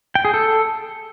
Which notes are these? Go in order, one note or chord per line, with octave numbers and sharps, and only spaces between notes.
G5
G#4
A4